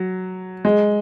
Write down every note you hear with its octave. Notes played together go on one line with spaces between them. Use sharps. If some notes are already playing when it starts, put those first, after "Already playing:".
Already playing: F#3
G#3